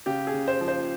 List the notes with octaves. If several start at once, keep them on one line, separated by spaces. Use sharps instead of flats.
C#3 G4
G#4
C#3
C5
F3
C5